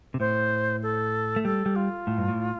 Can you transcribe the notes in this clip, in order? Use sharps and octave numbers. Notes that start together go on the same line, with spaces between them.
C3
A2 C5
A4
A3
G3 A4
G3
F4
A2
G2
A2